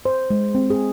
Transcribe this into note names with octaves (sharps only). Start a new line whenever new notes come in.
C5
G#3
C4
G#4